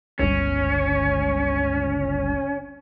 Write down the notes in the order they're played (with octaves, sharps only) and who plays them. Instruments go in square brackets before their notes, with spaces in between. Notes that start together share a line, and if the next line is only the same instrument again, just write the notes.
[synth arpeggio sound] G1 C#2 [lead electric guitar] C#4